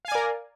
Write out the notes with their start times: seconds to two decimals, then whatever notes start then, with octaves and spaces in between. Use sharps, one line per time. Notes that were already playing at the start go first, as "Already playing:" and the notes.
0.05 F5
0.08 G#5
0.12 D5
0.15 A#4